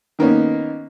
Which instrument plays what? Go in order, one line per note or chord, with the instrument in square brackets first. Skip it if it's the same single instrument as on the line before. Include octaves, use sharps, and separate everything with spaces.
[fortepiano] D#3 A#3 B3 C#4 D#4